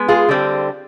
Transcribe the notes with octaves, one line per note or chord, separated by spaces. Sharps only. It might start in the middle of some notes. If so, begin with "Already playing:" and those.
Already playing: G#3 B3
F4 G#4
D3 G3 C4